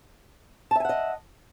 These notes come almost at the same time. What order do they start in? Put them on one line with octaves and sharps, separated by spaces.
A5 E5 G#5 F#5 D#5